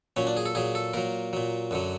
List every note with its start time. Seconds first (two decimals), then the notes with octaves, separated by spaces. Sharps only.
0.16 A#2 F#3 C#4
0.27 D4
0.37 G#4
0.46 A4
0.55 A#2 F#3 G#4
0.75 A4
0.94 A#2 F#3 A#4
1.33 A#2 F#3
1.71 F#2 D3 F#3